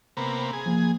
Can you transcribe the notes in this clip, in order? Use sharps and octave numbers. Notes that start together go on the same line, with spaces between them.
C3 A#3 B3
G#4
F3 A#3